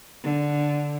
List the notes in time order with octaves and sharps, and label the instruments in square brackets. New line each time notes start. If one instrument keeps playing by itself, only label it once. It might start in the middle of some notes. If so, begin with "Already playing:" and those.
[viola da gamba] D3